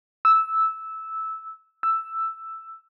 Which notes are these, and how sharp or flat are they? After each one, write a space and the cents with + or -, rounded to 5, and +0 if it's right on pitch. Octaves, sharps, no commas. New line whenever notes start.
E6 -10
E6 +5